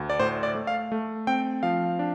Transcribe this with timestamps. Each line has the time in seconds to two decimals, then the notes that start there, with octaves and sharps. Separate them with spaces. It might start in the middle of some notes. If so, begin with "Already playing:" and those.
Already playing: D2
0.10 D5
0.19 A2 C5
0.43 D5
0.55 A3
0.67 F5
0.92 A3
1.27 C4 G5
1.63 F3 F5
1.99 D4